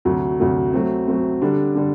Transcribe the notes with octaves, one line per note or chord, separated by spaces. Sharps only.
D2 C3 F#3 A3
D2 C3 F#3 A3
F#3 A3 C4
F#3 A3 C4
D3 G3 D4
D3 G3 D4